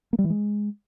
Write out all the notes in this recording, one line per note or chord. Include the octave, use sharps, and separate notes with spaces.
A#3
G3
E3
G#3